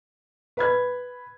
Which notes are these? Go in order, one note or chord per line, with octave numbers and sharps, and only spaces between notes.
B4 B5 G#6